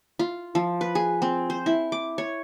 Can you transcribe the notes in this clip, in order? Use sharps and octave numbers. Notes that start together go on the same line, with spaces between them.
F4
F3
B4
G#4
C4
C5
E4
D6
C#5